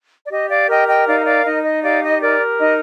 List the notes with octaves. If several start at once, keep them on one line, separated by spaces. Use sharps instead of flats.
D5
G4 D#5
D5 F5
A#4 D#5 G5
D#5 G5
D#4 D5 F5
D#5
D5 F5
D#4 D#5
D#5
G4 D5 F5
D#5
A#4 D5
D#4 D#5